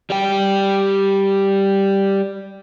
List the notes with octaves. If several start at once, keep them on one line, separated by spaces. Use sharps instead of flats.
G3 G5